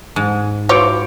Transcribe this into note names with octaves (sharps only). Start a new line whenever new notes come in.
G#2
E3 F4 F#4 C5 C#5 D6 C#7 D7